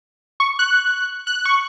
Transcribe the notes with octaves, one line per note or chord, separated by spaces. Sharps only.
C#6
F#6
F#6
C#6